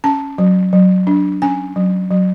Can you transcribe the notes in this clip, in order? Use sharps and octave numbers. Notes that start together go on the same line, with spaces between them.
C#4 A5
F#3
F#3
D4
C#4 G#5
F#3
F#3